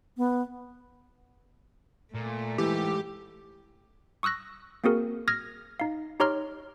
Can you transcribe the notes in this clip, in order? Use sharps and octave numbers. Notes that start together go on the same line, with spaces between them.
B3
A#2 A3
G#2 E3 G4
C#6 D#6 E6 F#6 A#6
A#3 C4 F#4 G#4 A#4
D#6 F6 G#6 A#6
D#4 F5
D#4 G4 C#5 A#5 C6 F6